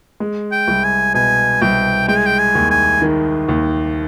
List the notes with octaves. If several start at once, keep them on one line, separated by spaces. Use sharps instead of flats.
G#3
G5
C2
G#5
B2 G#5
C2 G5
G#3 G5
G#5
G5
G#5
D#2
G#5
D#3
D#2